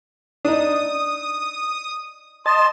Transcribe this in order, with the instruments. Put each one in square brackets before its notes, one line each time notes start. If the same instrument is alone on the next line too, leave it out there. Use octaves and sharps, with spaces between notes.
[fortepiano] D4 D#4 [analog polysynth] D#6
[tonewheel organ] D#5 A5 [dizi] C6